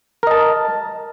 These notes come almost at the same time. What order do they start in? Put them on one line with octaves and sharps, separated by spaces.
A#4 D#5 A5